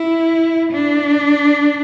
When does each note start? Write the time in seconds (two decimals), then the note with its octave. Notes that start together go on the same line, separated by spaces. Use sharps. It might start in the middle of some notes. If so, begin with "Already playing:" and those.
Already playing: E4
0.72 D4